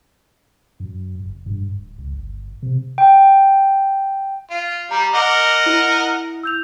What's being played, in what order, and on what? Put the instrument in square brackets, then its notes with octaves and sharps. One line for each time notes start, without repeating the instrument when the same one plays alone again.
[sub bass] F#2
F#1
G2
D1
C#2
G1
C3
[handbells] G5
[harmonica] F4
[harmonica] G3 [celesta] A#5
[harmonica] A#4 D#5 F#5 [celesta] D6
[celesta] E4
E6 G6 F7